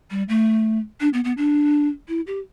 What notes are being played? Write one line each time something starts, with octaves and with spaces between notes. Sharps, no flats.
G3
A3
D4
B3
B3
D4
E4
G4